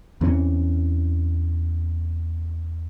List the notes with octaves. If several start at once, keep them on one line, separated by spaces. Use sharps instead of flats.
E2 E3 C4 C#4